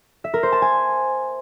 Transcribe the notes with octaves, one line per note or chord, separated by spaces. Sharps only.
E5
A#4
C5
A5
G#5